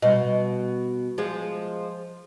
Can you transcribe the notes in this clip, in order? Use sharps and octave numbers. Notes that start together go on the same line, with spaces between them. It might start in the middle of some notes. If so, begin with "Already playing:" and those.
B2 G3 D#5
F3 G#3